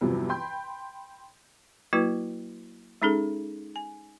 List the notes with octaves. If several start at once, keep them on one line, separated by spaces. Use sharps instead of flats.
E2 G2 C3 F3 F#3
G5 B5 C6 G6
F#3 A#3 E4 F#4 B4
G#3 C#4 D#4 G#4 A4
G#5